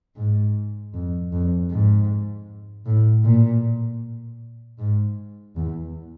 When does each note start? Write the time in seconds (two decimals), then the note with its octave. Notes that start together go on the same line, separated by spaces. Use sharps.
0.16 G#2
0.94 F2
1.32 F2
1.70 G#2
2.86 A2
3.24 A#2
4.79 G#2
5.56 E2